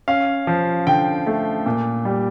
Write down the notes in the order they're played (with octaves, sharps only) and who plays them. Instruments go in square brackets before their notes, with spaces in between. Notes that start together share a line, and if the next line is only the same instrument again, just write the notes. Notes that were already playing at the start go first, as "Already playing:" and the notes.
[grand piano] C#4 F5
F3
D3 G5
A3
A#2
G3